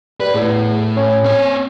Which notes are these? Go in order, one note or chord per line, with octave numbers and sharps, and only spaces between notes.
G3 B4
E2 A2
C#4
C4 C#5